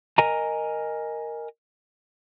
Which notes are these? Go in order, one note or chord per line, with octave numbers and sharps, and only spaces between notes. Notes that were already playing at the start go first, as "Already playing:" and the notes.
A#4 D#5 G#5 A#5